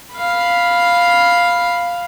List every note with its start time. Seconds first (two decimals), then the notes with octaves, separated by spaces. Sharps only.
0.15 F5 B5